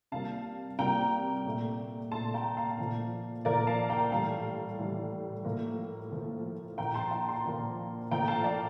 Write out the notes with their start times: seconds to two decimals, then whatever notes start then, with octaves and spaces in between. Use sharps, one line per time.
0.12 C3 G3 A#3 F5 A5
0.79 C3 G3 A#3 G5 A#5
1.46 A#2 A3
2.12 A#2 A3 A5 C6
2.34 G5 A#5
2.57 F5 A5
2.78 A#2 F3 A3
3.45 A#2 F3 A3 A#4 D5
3.67 F5 A5
3.90 G5 A#5
4.11 A2 E3 G3 F5 A5
4.79 A2 E3 G3
5.45 A2 F3 A#3
6.12 A2 F3 A#3
6.78 A#2 F3 A#3 G5 A#5
6.94 A5 C6
7.11 G5 A#5
7.28 A5 C6
7.45 A#2 F3 A#3
8.11 A2 F3 A#3 G5 A#5
8.28 F5 A5
8.44 D5 F5